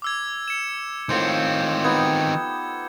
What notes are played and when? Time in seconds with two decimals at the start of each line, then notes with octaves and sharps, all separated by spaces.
0.02 D6 E6 G#6
0.48 C#7 E7
1.09 A2 D#3 C4 F4 C5 G6
1.84 B3 D#4 G4 G#6